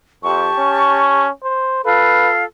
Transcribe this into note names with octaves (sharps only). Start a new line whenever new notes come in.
F2 G4 A5 C#6
C#4
C5
F4 A4 B4 F5